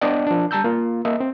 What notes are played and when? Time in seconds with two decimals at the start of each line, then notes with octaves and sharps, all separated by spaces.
0.01 B3 D4 D5 D#5 G5
0.27 F3 D4
0.51 G3 A5 A#5 E6 G6
0.64 A#3 F4
1.05 A#3 D#5 E5
1.20 C4